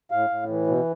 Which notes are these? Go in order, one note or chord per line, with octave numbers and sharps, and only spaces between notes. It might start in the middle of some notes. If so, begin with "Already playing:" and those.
A2 F5
A2
E3
B2